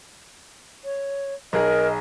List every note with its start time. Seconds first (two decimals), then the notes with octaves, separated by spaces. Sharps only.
0.85 C#5
1.53 B1 G#4 A#4 D#5